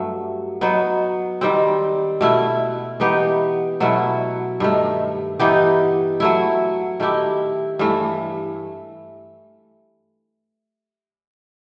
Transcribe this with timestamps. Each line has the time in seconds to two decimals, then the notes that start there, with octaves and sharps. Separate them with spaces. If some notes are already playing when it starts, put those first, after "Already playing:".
Already playing: G2 F#3 A3
0.61 F#3 B3 D#4
1.41 D#3 G3 C4
2.21 B2 A3 E4
3.00 E3 B3 D#4 G4
3.80 B2 F#3 A3 E4
4.60 G2 D#3 A3
5.39 E3 B3 D#4 G4
6.20 F#3 A3 E4
7.00 D#3 A3 E4 G4
7.79 G2 E3 A3